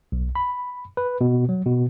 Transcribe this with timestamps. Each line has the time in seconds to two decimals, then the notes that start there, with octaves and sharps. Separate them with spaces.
0.12 B1
0.35 B5
0.97 B4
1.21 B2
1.49 F#3
1.66 B2